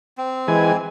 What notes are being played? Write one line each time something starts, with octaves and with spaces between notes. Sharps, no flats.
C4
E3 G#3 G#5